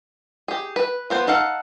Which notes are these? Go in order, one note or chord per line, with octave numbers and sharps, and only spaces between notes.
G4 G#4
B4
F3 B3 C5
D#4 A4 F5 F#5